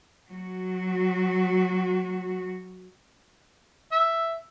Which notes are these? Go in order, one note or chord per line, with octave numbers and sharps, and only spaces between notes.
F#3 F#4
E5